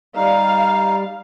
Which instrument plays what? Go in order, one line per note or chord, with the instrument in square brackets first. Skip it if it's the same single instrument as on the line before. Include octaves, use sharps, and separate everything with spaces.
[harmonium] G3 [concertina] D#4 [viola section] F5